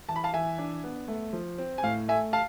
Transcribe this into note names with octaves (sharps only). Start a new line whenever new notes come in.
E3 A5
B5
F5 A5
E3 E5 G#5
D4
B3
A3
F3
C4
G#5
A2 F5
A3 E5 G#5
F5 A5